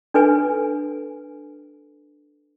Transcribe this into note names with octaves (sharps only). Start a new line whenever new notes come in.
D4 A4 B4 G#5